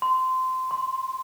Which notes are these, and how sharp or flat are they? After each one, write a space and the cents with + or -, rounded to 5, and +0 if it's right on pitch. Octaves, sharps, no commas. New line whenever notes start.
C6 -20
C6 +10